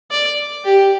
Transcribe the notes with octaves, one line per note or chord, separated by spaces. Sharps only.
D5
G4